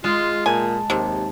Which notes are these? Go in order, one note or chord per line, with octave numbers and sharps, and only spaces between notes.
G#3 F4
A#2 G#5 A5
D#2 C3 D#3